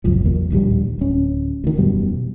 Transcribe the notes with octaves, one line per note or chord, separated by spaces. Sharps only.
G#1 C#2 F#2 F3
B1 E2 A#3
D1 A#1 D#2 G3
D1 C#4
D2 D#3
E1 F#2 B2 G3